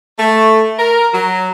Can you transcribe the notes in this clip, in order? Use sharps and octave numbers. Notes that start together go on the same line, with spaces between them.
A3
A#4
F#3